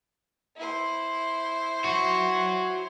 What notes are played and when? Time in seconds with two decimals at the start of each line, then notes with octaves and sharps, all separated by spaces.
0.57 E4 C5
1.84 F#4 C#5